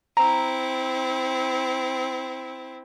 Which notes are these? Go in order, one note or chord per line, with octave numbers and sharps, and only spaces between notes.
C4 E4 A#5